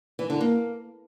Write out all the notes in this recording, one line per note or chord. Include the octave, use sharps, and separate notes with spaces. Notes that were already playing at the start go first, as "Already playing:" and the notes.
E3
D3
A#3